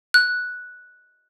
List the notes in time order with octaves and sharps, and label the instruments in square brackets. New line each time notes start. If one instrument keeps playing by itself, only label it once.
[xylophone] F#6